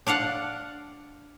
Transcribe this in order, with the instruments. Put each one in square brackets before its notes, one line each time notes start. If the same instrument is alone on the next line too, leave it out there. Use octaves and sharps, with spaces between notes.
[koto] D4 D5 F5 F#5